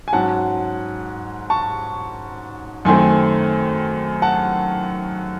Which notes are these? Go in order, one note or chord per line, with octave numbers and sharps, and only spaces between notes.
G#5
G#2 F#3 C#4 F#5 A5
A5 C#6
F#2 D#3 A3 C4 G#5 C6
F#5 A5